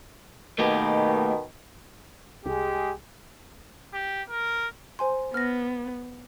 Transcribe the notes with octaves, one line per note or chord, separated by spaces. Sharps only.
B2 D#3 A3 A#3 G4
C2 G#3 G4 G#4
G4
A#4
C5 G#5 C6
B3 F6 A#6